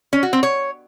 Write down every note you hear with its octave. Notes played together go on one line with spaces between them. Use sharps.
C#4
F#4
C4
C#5